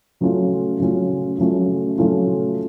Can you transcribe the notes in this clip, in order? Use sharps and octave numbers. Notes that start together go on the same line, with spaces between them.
C#3 F#3 A3 C#4 F4
C#3 F#3 A3 C#4 F4
C#3 F#3 A3 C#4 F4
C#3 F#3 A3 C#4 F4